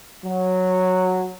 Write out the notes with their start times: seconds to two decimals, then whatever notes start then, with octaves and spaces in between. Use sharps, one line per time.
0.25 F#3